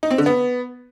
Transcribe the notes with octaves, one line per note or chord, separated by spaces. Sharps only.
D#4
C4
D3
B3